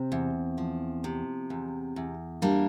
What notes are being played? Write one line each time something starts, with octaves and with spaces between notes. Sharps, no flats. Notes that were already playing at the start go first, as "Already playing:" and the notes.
Already playing: C3 C4
E2
F3
C3
E2
E2
G3 A#3 D4